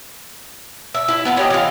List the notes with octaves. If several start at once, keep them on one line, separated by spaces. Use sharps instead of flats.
E5
E4
B3 E4 F4
C#4 G4 D#5
E3 F4